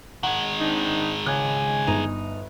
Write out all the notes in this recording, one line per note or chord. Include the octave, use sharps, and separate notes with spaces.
D#3 G#3 F#5
C4 D4 D#4
C#2 G#5 F#6
G1 D#4